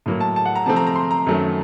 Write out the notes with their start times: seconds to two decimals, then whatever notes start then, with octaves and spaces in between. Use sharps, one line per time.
0.06 A2 F#3 A#3
0.21 A5
0.36 A5
0.46 F#5
0.56 A#5
0.66 C3 F3 A3 C4 A5
0.76 A#5
0.87 A#5
0.96 C6
1.11 A#5
1.26 F#2 D#3 F#3 A3